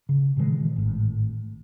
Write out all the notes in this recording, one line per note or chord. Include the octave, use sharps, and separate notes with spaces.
C#3
A#2 D#3 E3 G#3
G#1 A2